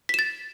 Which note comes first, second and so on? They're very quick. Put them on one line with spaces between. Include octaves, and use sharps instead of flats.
B6 E7 A6